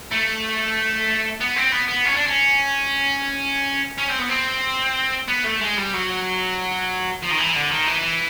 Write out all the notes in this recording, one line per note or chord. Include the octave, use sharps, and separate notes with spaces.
A3
B3
C4
B3
B3
C#4
D4
C#4
C#4
C4
B3
C4
B3
A3
G#3
G3
F#3
F3
D#3
E3
D3
D#3
E3